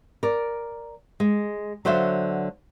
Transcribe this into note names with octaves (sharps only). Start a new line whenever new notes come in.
A#4 D5
G#3
D3 F#3 F#4 C5 E5 F5